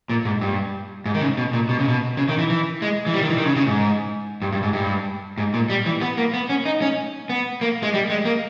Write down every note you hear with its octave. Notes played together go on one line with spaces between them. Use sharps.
A#2
G#2
G2
G#2
D#3
C#3
B2
A#2
B2
C#3
B2
C#3
D#3
E3
E3
G#3
E3
G3
D#3
E3
D#3
C#3
C#3
G#2
G2
G2
G#2
G2
G#2
A#2
G3
E3
B3
A#3
B3
C#4
D#4
C#4
B3
A#3
G#3
G3
G#3
A#3